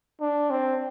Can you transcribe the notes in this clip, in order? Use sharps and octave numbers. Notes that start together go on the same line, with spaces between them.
D4
C4